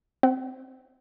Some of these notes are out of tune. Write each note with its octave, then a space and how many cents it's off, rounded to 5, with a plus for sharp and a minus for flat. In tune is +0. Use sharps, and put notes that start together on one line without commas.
C4 -5 F#5 +40